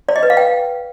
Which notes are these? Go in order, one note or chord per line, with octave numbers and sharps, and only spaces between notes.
D5
D#5
B4
F5
G5